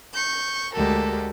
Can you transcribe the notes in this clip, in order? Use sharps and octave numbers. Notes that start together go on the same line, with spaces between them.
C#6 G6
D2 G#3 F#4 G4 A4 A#4